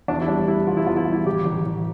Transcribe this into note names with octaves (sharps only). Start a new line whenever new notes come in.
E2 D4
E4
G3 D4
G3 E4
E2 F4
E4
E2 F4
E4
G3 F4
E4
A1 G4
A1
A1